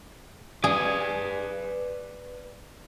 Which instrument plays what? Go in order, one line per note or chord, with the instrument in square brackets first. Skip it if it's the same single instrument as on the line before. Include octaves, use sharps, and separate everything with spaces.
[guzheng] G#4 [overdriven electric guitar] B4 D5